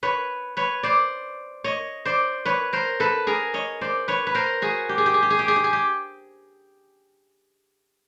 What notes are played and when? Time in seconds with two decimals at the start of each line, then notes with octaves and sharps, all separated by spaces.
0.03 B4 C#5
0.57 B4 C#5
0.83 C5 D5
1.64 C#5 D#5
2.05 C5 D5
2.45 B4 C#5
2.73 A#4 C5
3.00 A4 B4
3.27 G#4 A#4
3.54 C#5 D#5
3.81 C5 D5
4.08 B4 C#5
4.27 B4
4.35 A#4 C5
4.62 F#4 G#4
4.89 G4
4.98 G#4
5.06 G4
5.14 G#4
5.23 G4
5.30 G#4
5.39 G4
5.48 G#4
5.56 G4
5.64 G#4
5.73 G4